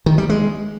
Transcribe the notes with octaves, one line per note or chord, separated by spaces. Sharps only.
D#3
G3
G#3